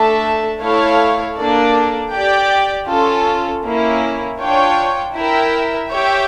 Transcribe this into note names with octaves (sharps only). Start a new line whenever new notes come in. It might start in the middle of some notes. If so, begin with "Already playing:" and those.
Already playing: A3 D4 A4 E5 A5
A3 E4 A4 C#5 F5
A#3 D4 A4 D5
G4 D5 G5
C#4 F4 A4
A#3 C#4 E4
D4 F4 C#5 G5
E4 A#4 E5 G5
G4 C#5 E5 G5